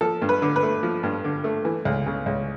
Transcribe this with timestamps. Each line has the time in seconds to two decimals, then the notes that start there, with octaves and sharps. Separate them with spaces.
0.01 F3 A4
0.22 G2
0.29 B4
0.42 D3
0.56 B4
0.63 A3
0.83 F3
1.03 G2
1.25 D3
1.44 A3
1.65 E3
1.85 C#2
2.06 C#3
2.26 C#2